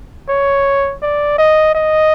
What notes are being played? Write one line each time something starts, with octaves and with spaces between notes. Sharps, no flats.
C#5
D5
D#5
D#5